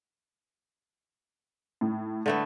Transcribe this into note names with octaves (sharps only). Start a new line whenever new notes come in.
A2
D3 A3 B3